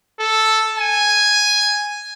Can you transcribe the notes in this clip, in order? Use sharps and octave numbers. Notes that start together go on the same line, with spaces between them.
A4
G#5